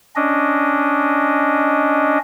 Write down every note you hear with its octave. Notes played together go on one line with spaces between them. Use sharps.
C#4 D4 D#5